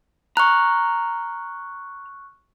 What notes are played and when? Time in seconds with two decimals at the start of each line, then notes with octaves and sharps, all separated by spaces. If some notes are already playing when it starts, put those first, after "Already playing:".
0.37 A#5 C#6 F6 F#6